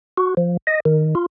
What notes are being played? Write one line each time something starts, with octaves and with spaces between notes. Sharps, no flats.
F#4
F3
D#5
D#3
F4